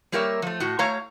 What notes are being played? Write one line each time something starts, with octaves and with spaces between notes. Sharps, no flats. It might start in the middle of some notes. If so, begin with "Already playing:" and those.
G3 A#3 G4 A#4 C#5 E5
F3 A3
A2 F#4
A3 C#5 F5 A#5